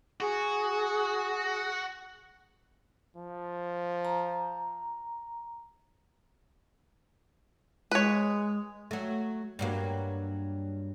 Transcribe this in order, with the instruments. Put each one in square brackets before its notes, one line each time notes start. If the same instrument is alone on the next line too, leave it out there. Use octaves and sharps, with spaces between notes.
[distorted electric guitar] F#4 [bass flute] G#4
[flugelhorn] F3
[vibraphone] A#5
[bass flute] G#3 [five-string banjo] B4 C#5
[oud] F#3 A3
G2 F#3 A#3